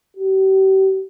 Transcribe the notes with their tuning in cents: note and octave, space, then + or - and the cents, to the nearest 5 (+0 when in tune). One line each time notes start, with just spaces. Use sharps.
G4 -40